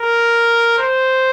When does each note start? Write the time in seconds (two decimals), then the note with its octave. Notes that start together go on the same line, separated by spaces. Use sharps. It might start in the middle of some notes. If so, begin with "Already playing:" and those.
Already playing: A#4
0.78 C5